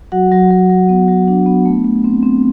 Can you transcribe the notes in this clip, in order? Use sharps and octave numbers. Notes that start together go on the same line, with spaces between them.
F#3 F#4 F#5
F#3
F#3
F#3
B3
F#3
D4
B3
A3
A3
C4
C4